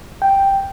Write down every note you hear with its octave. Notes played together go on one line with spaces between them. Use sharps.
G5